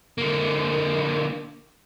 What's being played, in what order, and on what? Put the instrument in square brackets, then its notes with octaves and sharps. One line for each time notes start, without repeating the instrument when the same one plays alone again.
[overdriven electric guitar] D3 A#3